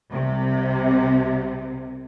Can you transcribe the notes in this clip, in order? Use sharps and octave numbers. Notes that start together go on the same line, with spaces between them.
C2 C3